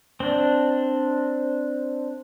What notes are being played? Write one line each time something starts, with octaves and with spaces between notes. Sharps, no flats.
C4 D4